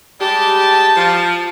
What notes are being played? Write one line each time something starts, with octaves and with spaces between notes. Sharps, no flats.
G3 G#3 G4 A5
F3